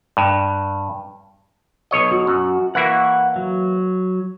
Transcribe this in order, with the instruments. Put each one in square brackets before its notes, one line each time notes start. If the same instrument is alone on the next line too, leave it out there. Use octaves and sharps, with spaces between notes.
[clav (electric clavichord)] G2
B1 C#5 D#5
[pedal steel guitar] F#4
[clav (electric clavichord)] F#2
[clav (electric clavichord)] E3 A#3 E4 [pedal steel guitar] F#5 C#6
[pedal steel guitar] F#3